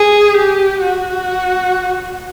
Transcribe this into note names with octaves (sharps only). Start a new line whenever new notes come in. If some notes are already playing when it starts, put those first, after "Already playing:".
Already playing: G#4
G4
F#4